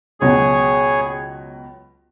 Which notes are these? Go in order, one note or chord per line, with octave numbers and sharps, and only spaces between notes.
C#2 B2 F#3 G#4 C#5